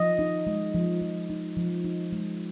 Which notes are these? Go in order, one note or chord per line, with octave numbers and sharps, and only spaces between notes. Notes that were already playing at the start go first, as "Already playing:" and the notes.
Already playing: F3 D#5
D#4
G#3
F3
F3
D#4
F3
D#4
G#3